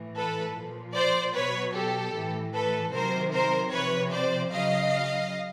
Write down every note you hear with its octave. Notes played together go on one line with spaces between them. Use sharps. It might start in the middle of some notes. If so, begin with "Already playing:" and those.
Already playing: A2 E3
A4 B4
A#2 F3
C5 D5
B2 F#3 B4 C#5
G4 A4
A2 E3
A4 B4
C3 D#3 F#3 A#4 C5
A#4 C5
C3 F3 B4 C#5
C5 D5
C#3 F#3 D#5 F5